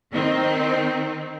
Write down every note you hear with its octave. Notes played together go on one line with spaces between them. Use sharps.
D#3 C4